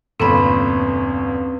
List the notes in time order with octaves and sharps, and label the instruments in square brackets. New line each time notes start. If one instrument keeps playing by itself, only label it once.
[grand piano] G1 E2 A#2 [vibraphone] C4 C#4 B4 [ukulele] A4 B5